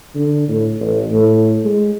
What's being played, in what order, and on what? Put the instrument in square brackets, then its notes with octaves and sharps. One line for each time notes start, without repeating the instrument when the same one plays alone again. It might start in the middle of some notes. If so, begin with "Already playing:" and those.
[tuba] D3
A2
A1
A2
G#3